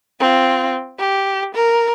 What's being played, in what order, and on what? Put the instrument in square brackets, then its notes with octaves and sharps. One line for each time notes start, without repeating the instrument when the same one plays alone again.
[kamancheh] C4 F4
G4
A#4